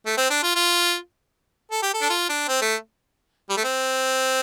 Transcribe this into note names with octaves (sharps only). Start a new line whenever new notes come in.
A3
C4
D4
F4
F4
A4
G4
A4
D4
F4
D4
C4
A3
G3
A3
C4